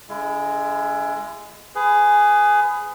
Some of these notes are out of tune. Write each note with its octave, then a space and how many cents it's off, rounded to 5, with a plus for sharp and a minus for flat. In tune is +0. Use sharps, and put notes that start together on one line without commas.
D3 -35 G#3 +0 E4 +35
G#4 +0 B4 +30